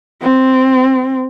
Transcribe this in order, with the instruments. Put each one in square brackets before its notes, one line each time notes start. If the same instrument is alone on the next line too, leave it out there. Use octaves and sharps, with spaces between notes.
[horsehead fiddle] C4